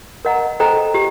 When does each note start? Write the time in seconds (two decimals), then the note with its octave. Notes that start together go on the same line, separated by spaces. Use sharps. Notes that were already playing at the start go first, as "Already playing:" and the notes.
0.25 A#4 D#5 F#5 A#5
0.60 A4 C5 D#5 G5 A#5
0.94 G4